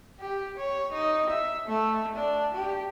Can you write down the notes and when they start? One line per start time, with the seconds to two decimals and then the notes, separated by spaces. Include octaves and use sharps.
0.20 G4
0.58 C#5
0.93 D#4
1.30 E5
1.66 A3
2.16 D4
2.54 G4